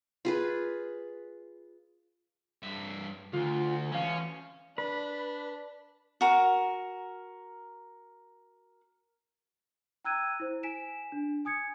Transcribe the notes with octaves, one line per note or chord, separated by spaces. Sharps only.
F4 G#4 B4
G2 E5
D2 F4
E3 C#4 F5
D4 B4
F#4 A#4
G5 A#5 E6 F#6 G#6 D#7
E4 C5
G#5 B6 D7 E7
D4
G#5 D#6 G#6 C#7